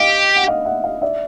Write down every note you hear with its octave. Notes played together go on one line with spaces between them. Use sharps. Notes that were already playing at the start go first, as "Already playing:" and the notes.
Already playing: G4 D#5 F5
F#5
D#5 F5
E5 F#5
D#5 F5
D5 E5